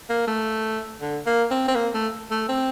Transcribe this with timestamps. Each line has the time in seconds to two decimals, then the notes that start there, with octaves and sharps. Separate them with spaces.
0.10 A#3
0.27 A3
1.01 D3
1.26 A#3
1.51 C4
1.68 C4
1.75 A#3
1.94 A3
2.31 A3
2.49 C4